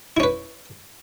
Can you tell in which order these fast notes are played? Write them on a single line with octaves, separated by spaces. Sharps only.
E4 C#4 B4